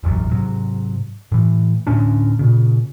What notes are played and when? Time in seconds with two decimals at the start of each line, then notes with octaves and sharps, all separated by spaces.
0.03 E1 A1 F#2
0.31 G#2 C3 F#3
1.32 A2 E3
1.87 D2 A2 C#4 D4
2.39 A#2 C#3